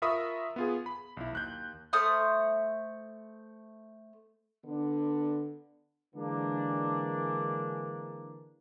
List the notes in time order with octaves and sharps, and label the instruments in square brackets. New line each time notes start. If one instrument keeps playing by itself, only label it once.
[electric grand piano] F4 A#4 E5 B5 C#6 D#6
B3 F4 G#4
B5
B1 E4
D#2 F#6 G6
[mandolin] A3 C5 D#6 F6
[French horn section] D3 B3 D4
[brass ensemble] D3 E3 G#3 A#3 D4